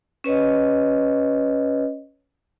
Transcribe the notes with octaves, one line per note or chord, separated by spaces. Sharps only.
C#4 B4 C#5 D#5